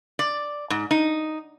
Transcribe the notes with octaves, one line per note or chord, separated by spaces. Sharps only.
D5
G#2
D#4